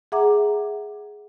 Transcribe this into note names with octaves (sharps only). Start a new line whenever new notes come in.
G#4 E5 F#5 A#5 D6